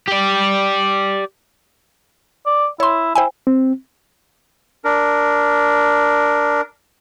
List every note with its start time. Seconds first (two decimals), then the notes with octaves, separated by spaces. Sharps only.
0.08 G4 D5
2.46 D5
2.80 E4 C#5 C6
3.15 E4 C5 G5 G#5
3.47 C4
4.84 D4 A#4